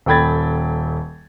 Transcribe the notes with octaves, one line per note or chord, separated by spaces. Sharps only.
D#1 A4 G5 B5 G#6 A6